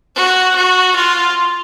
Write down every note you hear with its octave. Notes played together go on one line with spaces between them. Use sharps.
F#4
F#4
F4